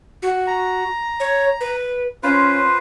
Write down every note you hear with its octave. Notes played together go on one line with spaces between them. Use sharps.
F#4
A#5
C#5
B4
C#4 F4 B4 C5